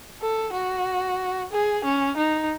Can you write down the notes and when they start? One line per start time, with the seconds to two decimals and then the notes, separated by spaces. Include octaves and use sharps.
0.21 A4
0.53 F#4
1.52 G#4
1.85 C#4
2.17 D#4